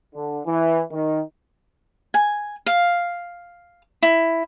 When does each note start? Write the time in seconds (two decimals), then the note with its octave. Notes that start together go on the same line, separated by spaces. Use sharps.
0.14 D3
0.45 E3
0.91 D#3
2.14 G#5
2.66 F5
4.03 E4